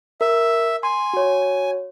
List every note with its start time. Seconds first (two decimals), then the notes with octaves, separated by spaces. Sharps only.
0.21 A#4 E5
0.83 G#5 C6
1.13 F#4 C#5